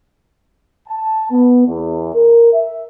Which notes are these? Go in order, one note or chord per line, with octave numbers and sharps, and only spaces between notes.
A5
B3
E2
A#4
E5